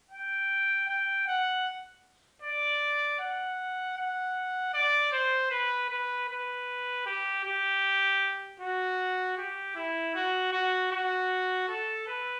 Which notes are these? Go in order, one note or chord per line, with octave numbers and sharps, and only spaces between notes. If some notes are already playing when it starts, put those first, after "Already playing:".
G5
G5
F#5
D5
F#5
F#5
D5
C5
B4
B4
B4
G4
G4
F#4
G4
E4
F#4
F#4
F#4
A4
B4